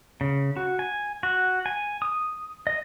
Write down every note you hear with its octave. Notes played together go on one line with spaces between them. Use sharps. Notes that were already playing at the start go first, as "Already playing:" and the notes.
C#3
F#4
G#5
F#4
G#5
D#6
D#5